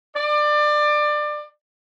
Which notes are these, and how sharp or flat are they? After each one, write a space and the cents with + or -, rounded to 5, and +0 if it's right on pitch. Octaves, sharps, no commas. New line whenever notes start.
D5 +25